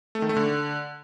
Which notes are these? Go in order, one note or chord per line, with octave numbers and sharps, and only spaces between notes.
A3
D#3
A3
D3